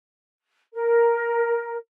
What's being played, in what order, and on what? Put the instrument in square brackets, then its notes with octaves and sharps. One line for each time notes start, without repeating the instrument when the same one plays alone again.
[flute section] A#4